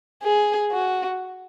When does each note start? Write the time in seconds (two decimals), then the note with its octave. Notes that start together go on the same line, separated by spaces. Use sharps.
0.23 G#4
0.71 F#4